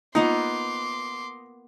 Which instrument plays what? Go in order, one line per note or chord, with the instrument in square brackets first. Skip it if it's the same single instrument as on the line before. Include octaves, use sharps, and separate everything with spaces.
[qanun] A#3 B3 F#5 [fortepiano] D#4 [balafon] F4 [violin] C6 D6